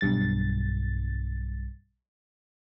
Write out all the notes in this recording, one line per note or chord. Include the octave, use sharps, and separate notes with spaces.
B1 G2 A6